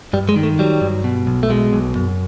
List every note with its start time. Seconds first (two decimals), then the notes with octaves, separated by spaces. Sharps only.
0.13 G2 G3
0.29 G#3
0.36 D#3
0.43 A3
0.59 F#3 G3
0.81 G2
1.04 B2
1.27 B1
1.43 A3
1.50 B2 G#3
1.73 B1
1.96 F#2